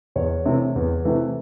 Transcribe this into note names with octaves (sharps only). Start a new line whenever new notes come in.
E2 C#5
C3 E3 A3
E2
C3 E3 A3